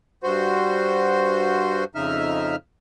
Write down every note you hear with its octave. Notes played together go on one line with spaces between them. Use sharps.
G2 F#4 C5
F2 C#3 D#4 E5 F6